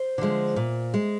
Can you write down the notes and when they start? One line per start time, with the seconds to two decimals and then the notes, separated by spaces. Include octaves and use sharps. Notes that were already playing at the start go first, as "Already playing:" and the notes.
Already playing: C5
0.18 D3 F3 G#3
0.56 A#2
0.94 G#3